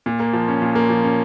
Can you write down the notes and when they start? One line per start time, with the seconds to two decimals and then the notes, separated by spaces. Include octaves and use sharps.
0.06 A#2
0.20 A#3
0.33 F3
0.48 C#4
0.62 A#2
0.75 A#3
0.90 F3
1.04 C#4